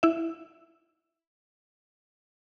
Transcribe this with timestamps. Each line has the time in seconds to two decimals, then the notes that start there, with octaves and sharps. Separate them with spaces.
0.03 E4 E5